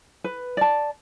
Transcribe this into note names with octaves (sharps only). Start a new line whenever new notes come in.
B4
D5 A5